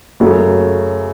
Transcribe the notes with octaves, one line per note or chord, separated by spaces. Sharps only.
F#2 C#3 F#3 A3